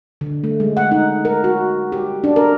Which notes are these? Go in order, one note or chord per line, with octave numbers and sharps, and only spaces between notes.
D3
A3
G#3
F#5
D#4
A#4
F#4
G4
D4
A#4